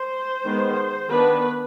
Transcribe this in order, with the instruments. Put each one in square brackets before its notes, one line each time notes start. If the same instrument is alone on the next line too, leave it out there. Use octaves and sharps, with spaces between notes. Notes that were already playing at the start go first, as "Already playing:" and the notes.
Already playing: [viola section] C5
D#3 G#3 B3
D#3 B3 D4 B4